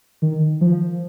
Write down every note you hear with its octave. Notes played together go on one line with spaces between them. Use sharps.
D#3
F3